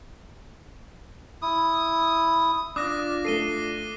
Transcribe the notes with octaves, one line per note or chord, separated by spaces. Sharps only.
E4 D#6
D4 F4 D6 D#6 F#6 A#6
A3 A4 C7 D#7 G7